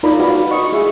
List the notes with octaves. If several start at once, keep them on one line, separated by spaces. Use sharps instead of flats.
D#4 F4 A#4 D5 A#5 B5
F#4 B4 D5 F5 B5
F#4 D#5 C#6
E4 G#4 E5 C#6